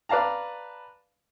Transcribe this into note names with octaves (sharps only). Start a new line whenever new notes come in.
B4 D5 F5 A5 A#5